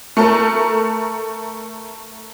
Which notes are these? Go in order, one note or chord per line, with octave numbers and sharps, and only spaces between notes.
A3 A4 A#4